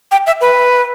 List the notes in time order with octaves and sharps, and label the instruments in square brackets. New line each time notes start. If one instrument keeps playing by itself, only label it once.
[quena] G5
E5
B4